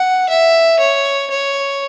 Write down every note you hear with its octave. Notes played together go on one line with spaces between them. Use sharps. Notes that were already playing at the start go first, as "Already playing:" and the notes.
Already playing: F#5
E5
C#5
C#5